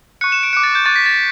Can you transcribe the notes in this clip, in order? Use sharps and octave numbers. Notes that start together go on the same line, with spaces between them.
C#6 F#6 C#7
E7
D7
D6 F#6 C#7
A6
G6
C#6 F#6 A6
B6
A6